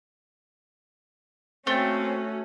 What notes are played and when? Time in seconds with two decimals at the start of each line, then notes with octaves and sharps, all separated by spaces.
1.67 A3 A#3 C4 C#4 F#4